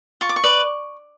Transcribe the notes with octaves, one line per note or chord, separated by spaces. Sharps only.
F4 C#6
D6
C#6
B4 D5